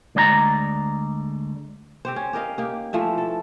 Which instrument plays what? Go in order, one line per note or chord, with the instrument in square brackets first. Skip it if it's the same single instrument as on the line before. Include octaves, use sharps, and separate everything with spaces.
[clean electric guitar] D2 G#3 D5 E5 A#5
[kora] C4 G4 C5
C#4
G4 A#4 D#5 F5
A#3 D#4 G4
E3 F3 A3 E5
A4